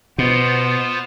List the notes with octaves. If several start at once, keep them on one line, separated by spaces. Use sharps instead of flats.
B2 B3 F4 C5